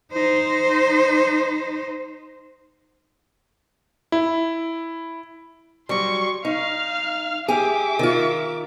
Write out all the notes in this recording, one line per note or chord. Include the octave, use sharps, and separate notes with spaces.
D#4 C5
E4
F#3 G3 C6 C#6
D#4 F5 F6
G4 G#4 E5 D6
D#3 F4